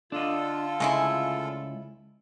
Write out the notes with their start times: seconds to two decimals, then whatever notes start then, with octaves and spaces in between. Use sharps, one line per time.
0.12 D3 D4 F4 A4 D#5
0.80 C#2 G#3 A3 E4 G#5